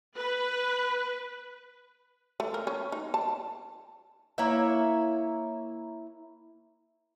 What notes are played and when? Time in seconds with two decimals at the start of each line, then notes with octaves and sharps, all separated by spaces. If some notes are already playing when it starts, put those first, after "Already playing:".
0.17 B4
2.40 A3
2.54 A#4
2.67 C#4
2.92 D#4
3.14 A5
4.38 A#3 E4 C#5 E5